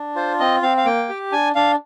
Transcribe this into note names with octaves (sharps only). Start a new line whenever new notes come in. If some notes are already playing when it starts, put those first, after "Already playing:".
Already playing: D4
F4 C5
C4 D#5
C4 F5
F5
A#3 G5
G4
D4 G#5
D4 F5